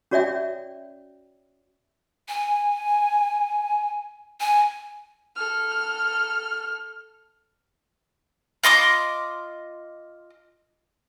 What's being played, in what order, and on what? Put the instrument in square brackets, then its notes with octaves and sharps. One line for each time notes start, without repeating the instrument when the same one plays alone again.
[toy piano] C#4 F#4 C#5 D5 E5 G5
[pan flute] G#5
G#5
[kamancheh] A4 F6
[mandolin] F4 D#5 C6 D6